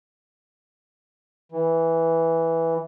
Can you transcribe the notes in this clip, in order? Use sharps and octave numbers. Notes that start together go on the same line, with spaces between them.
E3